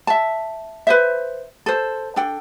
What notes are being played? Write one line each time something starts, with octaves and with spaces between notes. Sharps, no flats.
E5 A5
B4 C5 E5
A4 C5
D4 A4 G5